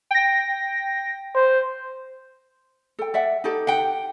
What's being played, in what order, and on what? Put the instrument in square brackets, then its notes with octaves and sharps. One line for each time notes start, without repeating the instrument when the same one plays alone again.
[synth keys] G5 A#6
[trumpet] C5
[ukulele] A4 G5
D5 E5 F#5
D#4 G4 A4
[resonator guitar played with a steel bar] F#5 G5